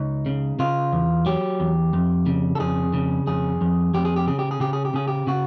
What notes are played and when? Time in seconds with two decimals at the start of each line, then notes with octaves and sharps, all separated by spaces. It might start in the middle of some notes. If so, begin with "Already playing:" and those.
Already playing: C#2 D#4
0.26 C#3
0.59 C#3 F4
0.93 E2
1.26 F#3 G4
1.60 E2
1.93 F2
2.26 C#3
2.55 A4
2.60 F2 G#4
2.93 C#3
3.27 F2 G#4
3.61 F2
3.94 F2 G4
4.05 G#4
4.16 G4
4.27 C#3 G#4
4.39 G4
4.51 G#4
4.60 C#3 G4
4.73 G#4
4.85 G4
4.94 C#3 G#4
5.08 G4
5.27 C#3 F#4